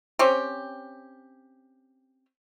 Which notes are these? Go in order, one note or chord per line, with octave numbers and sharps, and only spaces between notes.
C4 C#4 G4